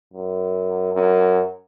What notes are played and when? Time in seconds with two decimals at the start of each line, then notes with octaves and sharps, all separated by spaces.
0.14 F#2
0.94 F#2